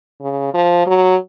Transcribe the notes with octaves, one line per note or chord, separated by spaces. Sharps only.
C#3
F3
F#3